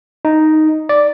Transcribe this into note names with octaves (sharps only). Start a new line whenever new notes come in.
D#4
D5